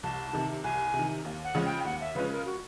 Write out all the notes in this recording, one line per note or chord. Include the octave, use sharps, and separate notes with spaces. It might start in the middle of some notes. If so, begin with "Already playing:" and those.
C2 A5
C3 D#3
C2 G#5
C3
D#3
D#2
F#5
C#3 F3 G#3 C#4
G5
D#2 F#5
E5
C#3 F3 G#3 C#4 B4
A#4
F#4